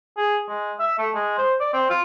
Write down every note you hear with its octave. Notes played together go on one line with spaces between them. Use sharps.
G#4
G#3
E5
A3
G#3
C5
D5
C4
F4